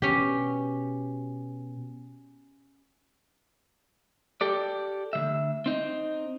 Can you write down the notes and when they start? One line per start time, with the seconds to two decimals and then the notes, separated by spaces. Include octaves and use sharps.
0.02 B2 C#4 G4
4.41 G4 A4 D5
5.13 D2 D#3 E5
5.66 C4 D#4